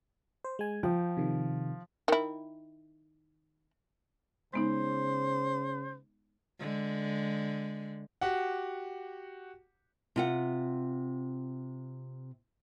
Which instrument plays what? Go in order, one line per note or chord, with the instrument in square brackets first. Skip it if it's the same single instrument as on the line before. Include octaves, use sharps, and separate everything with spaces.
[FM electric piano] C5
G#3 G#5
[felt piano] F3 [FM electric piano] G5
[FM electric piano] C3 D#3
[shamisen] D#3 E4
[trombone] C#3 [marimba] G#3 B3 D#4 [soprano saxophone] C5
[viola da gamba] D3 G#3
[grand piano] F#4 G4 F#5
[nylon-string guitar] C3 F4 F#5